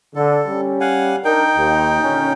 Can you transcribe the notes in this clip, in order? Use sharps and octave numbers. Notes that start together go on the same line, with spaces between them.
D3 A4
G3 C#4
F5 F#5 G#5
D4 D#4 A#4 G5
D#2
A#2 D3 C#4